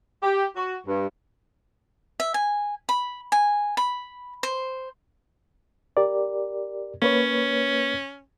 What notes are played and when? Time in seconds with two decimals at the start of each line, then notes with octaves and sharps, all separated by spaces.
0.22 G4
0.56 F#4
0.87 G2
2.20 E5
2.34 G#5
2.89 B5
3.32 G#5
3.77 B5
4.43 C5
5.97 G4 A#4 D5
7.02 A#3 C#4 B4 C#5